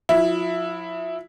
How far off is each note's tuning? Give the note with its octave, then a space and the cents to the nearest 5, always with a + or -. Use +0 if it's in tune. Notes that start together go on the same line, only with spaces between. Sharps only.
F3 +40 E4 +0